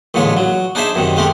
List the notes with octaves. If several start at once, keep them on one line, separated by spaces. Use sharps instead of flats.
A1 A#2 D3 G#3 C#5
F#3
D4 D#4 G#4 C5 E5
F#2 C3 D#3
G#3 A3 C4 G4